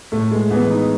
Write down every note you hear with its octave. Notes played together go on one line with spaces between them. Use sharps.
A2 A3
G#3
E3 B3
D#4